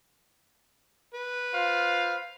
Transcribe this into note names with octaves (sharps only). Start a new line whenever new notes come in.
B4
F4 C5 F5